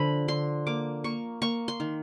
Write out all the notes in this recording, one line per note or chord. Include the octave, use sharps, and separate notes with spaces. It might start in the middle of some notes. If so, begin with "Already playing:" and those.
Already playing: D3 F3 B5
D3 C6
A#3 D6
A#3 C#6
A#3 C#6
C6
D#3